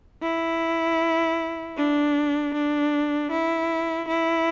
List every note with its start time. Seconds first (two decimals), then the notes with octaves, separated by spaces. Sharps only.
0.22 E4
1.77 D4
2.54 D4
3.31 E4
4.08 E4